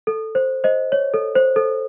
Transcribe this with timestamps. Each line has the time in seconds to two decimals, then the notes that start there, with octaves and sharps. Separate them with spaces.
0.07 A4
0.35 C5
0.64 C5 D#5
0.92 C#5
1.14 A4
1.35 C5
1.56 A4